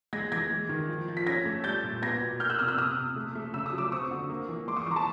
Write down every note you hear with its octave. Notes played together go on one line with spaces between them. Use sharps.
G#3 G#6 A#6
E3 G#6 A#6
G#3
D#3
F3
F3
B6
C#4 G#6 A#6
A3
G3 G6 A6
A#2
B3 G#6 A#6
B2
A#3 F6 G6
E6 F#6
C3 D#6 F6
E6 F#6
C3 D#6 F6
C3
A3
A3
C#3 E6
D#6
F#3
D6 E6
C4 C#6 D#6
D3
A#3
E3
G#3 C6 D6
C#6 D#6
E3 A#5 C6 D6
A5 B5